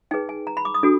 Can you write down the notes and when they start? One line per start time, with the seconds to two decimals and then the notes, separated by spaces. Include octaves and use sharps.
0.11 D#4 G#4 B4 G5
0.29 G#5
0.47 A#5
0.57 B5
0.65 D6
0.74 D#6
0.83 D4 F#4 A4